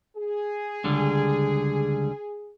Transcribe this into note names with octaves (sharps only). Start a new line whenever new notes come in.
G#4
C#2 D3 G3